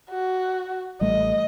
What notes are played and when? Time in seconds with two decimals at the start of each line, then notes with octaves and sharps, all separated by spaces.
0.10 F#4
1.01 A1 G3 A3 D#5